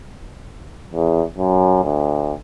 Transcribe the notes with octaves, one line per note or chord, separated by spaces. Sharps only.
E2
F#2
D2